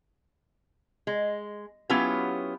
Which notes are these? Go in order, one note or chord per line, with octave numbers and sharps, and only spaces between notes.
G#3
F#3 B3 C#4 E4 F4 G4